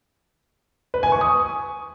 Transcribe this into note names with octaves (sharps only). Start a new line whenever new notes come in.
B4
G#5
C#6
D#6